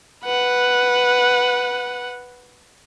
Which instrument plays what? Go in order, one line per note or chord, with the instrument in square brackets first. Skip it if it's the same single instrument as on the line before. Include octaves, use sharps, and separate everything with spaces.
[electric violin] B4 F#5